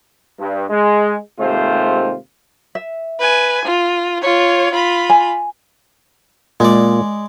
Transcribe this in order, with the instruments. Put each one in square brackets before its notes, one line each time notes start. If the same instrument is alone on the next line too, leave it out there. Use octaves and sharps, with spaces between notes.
[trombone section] G2
G#3
D#2 G#2 C3 A3 F4 C5
[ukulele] E5
[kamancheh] B4 G#5
F4
F4 C#5
F4 B5
[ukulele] G#5
[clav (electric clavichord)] A#2 [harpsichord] G#3 D5